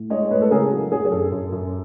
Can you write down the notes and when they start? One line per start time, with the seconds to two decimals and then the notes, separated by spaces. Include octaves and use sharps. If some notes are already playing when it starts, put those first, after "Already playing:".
Already playing: A2
0.10 G#3 C#5 D#5
0.31 A2 B4 C#5
0.42 A4
0.51 C#3 G#4 A#4
0.72 F#3
0.92 F#3 G#4
1.05 G#4
1.12 F#2 A4
1.32 F#2
1.52 F#2